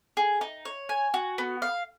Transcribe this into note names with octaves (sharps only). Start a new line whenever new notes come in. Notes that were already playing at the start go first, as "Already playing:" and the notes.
G#4
D#4
C#5
G#5
F#4
B3
F5